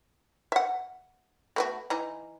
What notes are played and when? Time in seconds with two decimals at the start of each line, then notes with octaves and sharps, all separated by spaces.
0.52 E5 F#5
1.56 A3 B3 F#4
1.90 E3 D#4